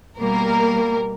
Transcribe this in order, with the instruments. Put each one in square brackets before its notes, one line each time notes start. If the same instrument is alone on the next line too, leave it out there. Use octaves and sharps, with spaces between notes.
[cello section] B2 G3 A#3 [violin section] A#4